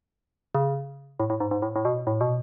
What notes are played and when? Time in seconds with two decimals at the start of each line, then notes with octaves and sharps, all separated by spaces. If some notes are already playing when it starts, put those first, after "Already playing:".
0.55 C#3
1.20 A2
1.30 A2
1.40 G#2
1.51 G#2
1.62 A2
1.76 A2
1.85 B2
2.07 A2
2.21 B2